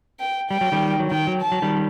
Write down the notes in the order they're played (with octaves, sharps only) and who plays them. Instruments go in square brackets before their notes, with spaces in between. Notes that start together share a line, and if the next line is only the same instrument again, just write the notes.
[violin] G5
[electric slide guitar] G3 [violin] G5
[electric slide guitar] F#3
D#3 G3
F#3
[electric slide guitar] D#3 [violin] G5
[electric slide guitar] F#3
[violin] A5
[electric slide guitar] F#3
D#3 G3